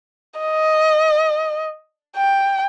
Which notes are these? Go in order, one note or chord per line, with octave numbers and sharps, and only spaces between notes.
D#5
G5